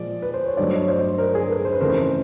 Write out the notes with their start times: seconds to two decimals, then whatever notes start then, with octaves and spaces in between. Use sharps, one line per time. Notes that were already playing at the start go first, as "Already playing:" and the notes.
Already playing: A#2 F3 G#3 D5
0.22 B4
0.34 C5
0.46 C#5
0.57 G2 D#3 F#3 A3 C5 D5
0.73 C#5 D#5
0.88 C5 D5
1.18 A#4 C5
1.34 G#4 A#4
1.49 A4 B4
1.65 C5
1.73 B4
1.80 F2 C#3 E3 A3 A#4 C5